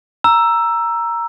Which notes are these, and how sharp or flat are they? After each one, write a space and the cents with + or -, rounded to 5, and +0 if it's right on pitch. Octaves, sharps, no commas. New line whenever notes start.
A#5 +5 E6 +10